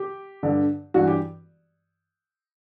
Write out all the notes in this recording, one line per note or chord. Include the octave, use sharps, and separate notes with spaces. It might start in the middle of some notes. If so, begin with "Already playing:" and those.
Already playing: G4
G2 D3
G2 E3 F#4
G4